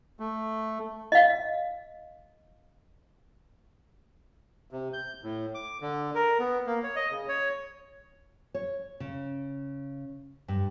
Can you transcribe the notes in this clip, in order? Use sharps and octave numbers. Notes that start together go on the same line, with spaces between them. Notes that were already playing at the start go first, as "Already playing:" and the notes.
A3
D#5 F5
C3
G6
A2
D6
D3
A#4
B3
A#3
C#5
D#5
C#3
C#5
C#5
C#3
G2